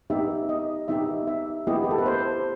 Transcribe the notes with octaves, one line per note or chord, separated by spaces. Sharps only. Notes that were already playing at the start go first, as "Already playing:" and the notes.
B3 D#4 G4 E5
D#5
B3 D#4 G4 E5
E5
B3 E4 G4 D#5
G4
A4
B4
C5